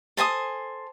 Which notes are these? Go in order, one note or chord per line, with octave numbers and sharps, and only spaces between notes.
A4 C5 G#5 D#6